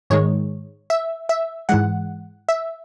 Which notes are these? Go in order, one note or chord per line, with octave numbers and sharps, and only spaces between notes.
G#2 D#3 G#3 C#5
E5
E5
G#2 E3 G#3 F#5
E5